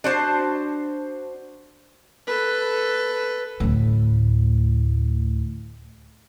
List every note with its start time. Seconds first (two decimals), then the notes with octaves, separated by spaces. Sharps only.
0.04 D4 F#4 C5 A5
2.27 A4 B4
3.60 D2 A2